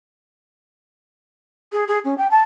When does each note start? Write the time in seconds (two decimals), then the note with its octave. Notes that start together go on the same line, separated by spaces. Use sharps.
1.72 G#4
1.88 G#4
2.04 C#4
2.18 G5
2.31 A5